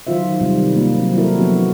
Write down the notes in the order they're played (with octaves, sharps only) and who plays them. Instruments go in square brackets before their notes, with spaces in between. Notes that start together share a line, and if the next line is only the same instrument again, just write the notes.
[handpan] D#3 F#3 F4 C5 E5
C3 D#3 G3
A#3 C4 F4
F#3 C4
E4 F#4 A4 A#4
F3 F#3 B3 D4 F#4